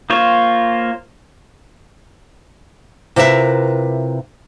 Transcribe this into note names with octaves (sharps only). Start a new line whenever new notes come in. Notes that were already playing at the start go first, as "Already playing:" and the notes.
A#3 F4 C5 C#5
C3 E4 F4 A#4 B4 E5